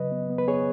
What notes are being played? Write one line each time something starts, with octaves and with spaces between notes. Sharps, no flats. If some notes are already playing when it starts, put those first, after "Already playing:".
Already playing: C#3 F#3 B4 D#5
B3
B3
B4
B3 G#4 C#5